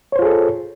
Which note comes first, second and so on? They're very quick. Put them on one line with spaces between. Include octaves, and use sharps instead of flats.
C#5 C5 F4 G#4 A4